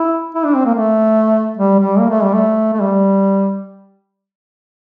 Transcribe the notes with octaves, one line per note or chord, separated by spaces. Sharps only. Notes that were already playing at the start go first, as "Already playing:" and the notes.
Already playing: E4
E4
D4
C4
A#3
A3
G3
G3
A#3
A3
G3
A3
A3
G3